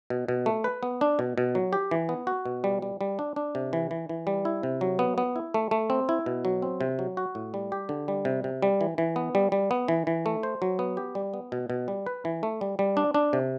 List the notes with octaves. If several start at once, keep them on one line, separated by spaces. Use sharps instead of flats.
B2
B2
A3
B4
B3
D4
B2
B2
F#3
G4
E3
B3
F#4
B2
G3
G3
G3
D4
D4
C3
E3
E3
E3
G3
E4
C3
F#3
B3
B3
E4
A3
A3
C4
E4
B2
F#3
C4
C3
F#3
F#4
A2
G3
G4
D3
G3
C3
C3
G3
E3
E3
B3
G3
G3
B3
E3
E3
A3
C5
F#3
B3
G4
G3
B3
B2
B2
G3
B4
E3
A3
G3
G3
D4
D4
C3